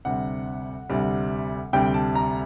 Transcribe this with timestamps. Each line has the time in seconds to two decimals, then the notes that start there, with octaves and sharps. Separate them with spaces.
0.05 D2 C3 G3 F#5
0.90 D2 C3 G3
1.73 D2 C3 G3 G5
1.94 A5
2.15 A#5